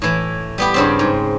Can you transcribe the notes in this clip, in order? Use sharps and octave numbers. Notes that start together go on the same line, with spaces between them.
A2 E3
G3 B3 G4
G2 C#3 C4
G#2